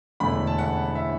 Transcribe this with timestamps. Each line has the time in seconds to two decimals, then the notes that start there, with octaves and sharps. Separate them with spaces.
0.20 E1 E2 D3 A3 D4 B5
0.47 A5
0.58 F#5
0.95 E5